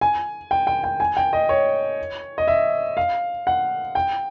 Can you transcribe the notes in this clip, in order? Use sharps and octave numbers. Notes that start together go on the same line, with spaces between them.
G#5
G5
G5
G5
G#5
G5
D#5
C#5
D#5
E5
F5
F#5
G5